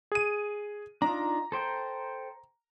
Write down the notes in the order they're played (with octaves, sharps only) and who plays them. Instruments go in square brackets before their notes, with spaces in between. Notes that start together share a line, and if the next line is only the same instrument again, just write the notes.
[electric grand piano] G#4 D#7
[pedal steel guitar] D4 D#4 F4 [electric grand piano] A#5
[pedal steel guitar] A4 C5 G5